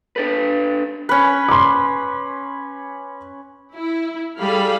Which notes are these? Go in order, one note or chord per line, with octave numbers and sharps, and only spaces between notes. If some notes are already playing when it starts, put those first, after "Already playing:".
D4 A4 B4
C#4 B4
C6 D6
E4
G3 G#4 A4 F5 B5